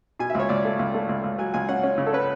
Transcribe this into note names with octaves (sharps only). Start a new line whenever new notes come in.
B2 G#5
E5
C#2 C#5
C#2 D5
A3
C#2
A3
C#2
C#2
F#3 G#5
C#2 G#5
C#4 F#5
C#4
C#3
A4
C#4 B4